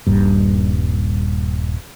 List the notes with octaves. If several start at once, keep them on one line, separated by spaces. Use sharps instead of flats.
D#1 G2